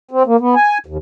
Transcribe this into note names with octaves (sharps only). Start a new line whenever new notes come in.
C4
A#3
B3
G#5
D#2